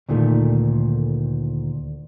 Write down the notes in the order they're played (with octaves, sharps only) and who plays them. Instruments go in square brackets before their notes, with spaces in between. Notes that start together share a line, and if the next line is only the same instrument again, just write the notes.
[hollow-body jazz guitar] D2 A#2 D#3 A3